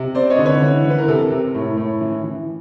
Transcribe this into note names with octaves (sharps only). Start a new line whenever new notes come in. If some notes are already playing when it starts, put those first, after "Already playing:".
Already playing: C3
C4 C5 D5
C#5 D#5
D3
B4 C#5
E3
E3
B4
A#4
C3 A4
C3 A#4
A2
A2
E3
E3